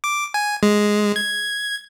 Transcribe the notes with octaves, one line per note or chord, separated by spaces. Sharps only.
D6
G#5
G#3
G#6